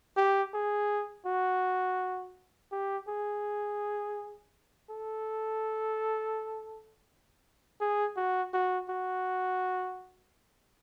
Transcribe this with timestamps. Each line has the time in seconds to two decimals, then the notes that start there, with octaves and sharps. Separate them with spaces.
0.17 G4
0.54 G#4
1.26 F#4
2.72 G4
3.08 G#4
4.89 A4
7.81 G#4
8.17 F#4
8.53 F#4
8.89 F#4